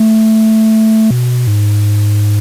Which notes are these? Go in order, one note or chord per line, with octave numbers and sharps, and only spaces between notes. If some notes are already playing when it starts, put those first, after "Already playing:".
Already playing: A3
B2
G#2